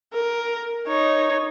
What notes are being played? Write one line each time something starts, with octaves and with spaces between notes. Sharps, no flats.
A#4
D#4 C#5